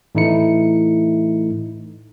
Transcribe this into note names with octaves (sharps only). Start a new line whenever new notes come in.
A2 E3 A3 D#4 E4 C#7